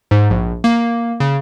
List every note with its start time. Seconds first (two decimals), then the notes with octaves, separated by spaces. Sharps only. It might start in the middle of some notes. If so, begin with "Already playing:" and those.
0.11 G#2
0.30 A#1
0.64 A#3
1.20 C#3